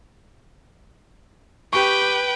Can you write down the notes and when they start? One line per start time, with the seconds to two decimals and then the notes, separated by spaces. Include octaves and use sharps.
1.73 G4 B4 G5 C#6